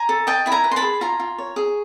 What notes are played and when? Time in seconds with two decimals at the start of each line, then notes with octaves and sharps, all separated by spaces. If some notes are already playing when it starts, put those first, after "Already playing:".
Already playing: G#5 A#5
0.09 A4
0.27 D#5 G5 A5
0.46 E4 B5
0.52 G#5 A#5
0.64 B4
0.71 C6
0.76 A5 B5
0.82 G#4
1.01 F4 G#5 A#5
1.20 F4
1.38 C#5
1.56 G#4